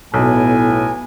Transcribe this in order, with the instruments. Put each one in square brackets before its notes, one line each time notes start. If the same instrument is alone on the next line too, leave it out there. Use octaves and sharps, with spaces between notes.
[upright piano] B1 [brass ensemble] A2 [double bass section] B3 [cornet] G#5